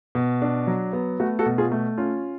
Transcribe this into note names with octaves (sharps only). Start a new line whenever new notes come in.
B2
D4
F#3
B3
A3 F#4
F#4 A4
B2
F4 G#4
A3
C#4 F4